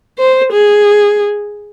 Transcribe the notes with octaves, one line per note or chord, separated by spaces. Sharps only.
C5
G#4